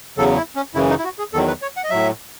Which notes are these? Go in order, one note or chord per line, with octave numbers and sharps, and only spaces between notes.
E2 C#3 F#3 A4
E4
C#4
F#2 C#3 E3 E4
D#4
E4
F#4
G#4
E2 D#3 F#3 A4
B4
C#5
F#5
D#5
A2 F#3 E5